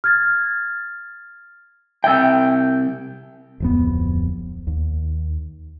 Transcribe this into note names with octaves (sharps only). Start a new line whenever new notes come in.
F6 G#6 A6
C2 E5 G5 E6
D1 F2 B3
D#2